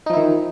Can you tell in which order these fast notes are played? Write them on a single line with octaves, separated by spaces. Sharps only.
D#4 F3 E4 D#3